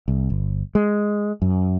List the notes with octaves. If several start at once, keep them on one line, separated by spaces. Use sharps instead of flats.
C2
G1
G#3
F#2